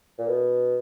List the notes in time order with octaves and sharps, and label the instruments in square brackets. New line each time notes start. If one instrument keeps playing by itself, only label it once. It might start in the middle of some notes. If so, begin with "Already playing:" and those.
[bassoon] A#2
B2